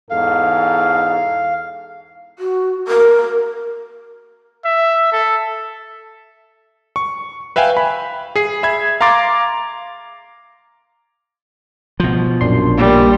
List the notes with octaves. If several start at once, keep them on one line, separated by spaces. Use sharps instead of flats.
E2 G#2 A4 F5
F#4
A#4
E5
A4
C#6
B4 E5 F5 G5 G#5
B5
G#4 C7
E5 B5 G#6
F5 A#5 C6 D6 A6
B2 F3
A#1 F#2 D4 C6
G3 A#3